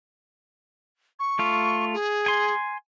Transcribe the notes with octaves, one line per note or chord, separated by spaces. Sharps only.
C#6
A3 F4
G#4
G#5 C6